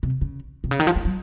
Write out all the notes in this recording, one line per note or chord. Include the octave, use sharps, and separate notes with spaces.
C3
C#3
C3
C#3
D#3
F3
G#3
F#3